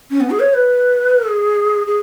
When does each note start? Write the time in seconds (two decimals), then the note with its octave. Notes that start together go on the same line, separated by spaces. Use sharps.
0.11 C#4
0.20 B3
0.30 G#4
0.40 C#5
0.54 B4
1.27 G#4
1.87 G#4